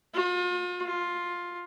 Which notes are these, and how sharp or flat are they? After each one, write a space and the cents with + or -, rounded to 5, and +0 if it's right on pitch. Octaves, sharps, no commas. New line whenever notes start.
F4 +40
F4 +10